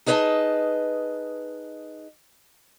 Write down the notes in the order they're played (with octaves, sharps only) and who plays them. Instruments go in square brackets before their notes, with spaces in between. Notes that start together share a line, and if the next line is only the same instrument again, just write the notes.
[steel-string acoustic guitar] D#4 G#4 B4 C5 D#5 A5